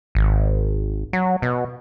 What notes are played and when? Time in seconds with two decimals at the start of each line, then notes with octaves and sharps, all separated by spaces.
0.15 G#1
1.13 F#3
1.42 B2